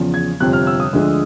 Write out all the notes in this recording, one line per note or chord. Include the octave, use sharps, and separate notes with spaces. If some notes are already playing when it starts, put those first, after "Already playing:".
Already playing: E2 C#3 F3
G#6
G1 F2 C3 F3 F#6
F6
E6
D#6
D2 D3 F3 G#3